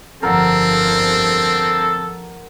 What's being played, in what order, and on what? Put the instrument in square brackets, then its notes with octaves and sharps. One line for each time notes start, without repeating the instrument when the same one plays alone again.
[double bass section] G1 F2 F3 [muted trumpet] C4 [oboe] A4 [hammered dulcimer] A#4 F#5 A#5